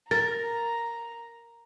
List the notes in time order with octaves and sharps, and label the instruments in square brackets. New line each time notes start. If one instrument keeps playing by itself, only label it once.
[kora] A#4 [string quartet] A#5 [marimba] A6